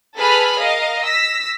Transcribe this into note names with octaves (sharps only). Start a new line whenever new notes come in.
G#4 A4 B4 A5 B5 F6
A#4 D#5 F5
E6 A#6 B6